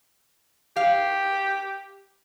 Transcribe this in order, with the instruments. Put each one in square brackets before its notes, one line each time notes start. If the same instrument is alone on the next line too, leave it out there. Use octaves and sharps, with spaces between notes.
[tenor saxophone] G4 [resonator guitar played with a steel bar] F5